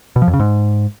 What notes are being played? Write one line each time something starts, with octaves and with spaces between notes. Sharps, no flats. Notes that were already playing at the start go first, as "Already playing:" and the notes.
B2
F3
F2
C#3
G#2